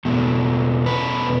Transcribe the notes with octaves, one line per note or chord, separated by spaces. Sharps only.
E2 B2 A3
B4